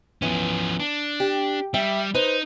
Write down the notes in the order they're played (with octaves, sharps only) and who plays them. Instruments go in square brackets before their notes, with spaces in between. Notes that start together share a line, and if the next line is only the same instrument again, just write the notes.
[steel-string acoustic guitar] E3 B3 [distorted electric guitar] F3 C#4
[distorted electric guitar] D4
[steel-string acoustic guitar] G4
[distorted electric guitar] G3 [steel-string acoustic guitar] E5 G5
[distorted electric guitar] D#4 [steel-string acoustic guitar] B4 C5